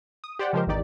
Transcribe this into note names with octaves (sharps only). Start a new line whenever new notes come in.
D#6
G4 C5 D5 F#5 G5
C#3 F3 G#3 G4 A#4 C5
G#1 E2 D#3 D#4 G4 D5